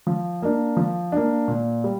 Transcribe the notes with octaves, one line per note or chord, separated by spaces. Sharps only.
F3
A#3 D4
F3
A#3 D4
A#2
G3